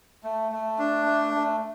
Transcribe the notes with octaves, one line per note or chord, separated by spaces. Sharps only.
A3
A3
D4
A3
A3